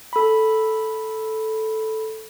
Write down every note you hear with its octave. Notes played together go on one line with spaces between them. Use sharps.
A4 B5